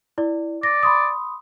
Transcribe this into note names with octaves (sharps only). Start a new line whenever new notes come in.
E4 D5
D5 A#6
B5 C6 D#6